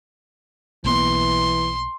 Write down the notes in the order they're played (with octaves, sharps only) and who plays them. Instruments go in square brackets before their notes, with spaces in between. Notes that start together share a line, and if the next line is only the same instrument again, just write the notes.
[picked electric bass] B1 A#3 B3 [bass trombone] E3 [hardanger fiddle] C6